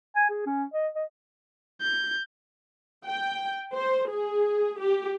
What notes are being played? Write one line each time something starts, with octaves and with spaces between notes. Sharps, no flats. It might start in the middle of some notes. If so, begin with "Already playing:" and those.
G#5
G#4
C#4
D#5
D#5
G6
G5
C5
G#4
G4